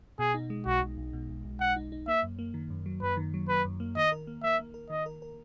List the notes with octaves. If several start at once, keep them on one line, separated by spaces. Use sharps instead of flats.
B2 G#4
D#4
G#3
B1 F#4
B1
B1
B2
B1
B1
B1 F#5
D#4
D#4
A#3 E5
F#2
A#3
D#3
F#2
F#3
F#2 B4
D#3
F#3
F#3 B4
F#2
A#3
D#3 D#5
A#4
A#3
A#3 E5
A#3
A#4
D#3 D#5
A#4
A#4